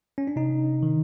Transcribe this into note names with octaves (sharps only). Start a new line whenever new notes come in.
C#4
D4
C3 D#4
D#3